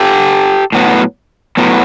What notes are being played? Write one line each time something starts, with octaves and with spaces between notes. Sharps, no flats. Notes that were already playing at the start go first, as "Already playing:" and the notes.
Already playing: G4 A4
A2 F#3 B3
A2 F#3 B3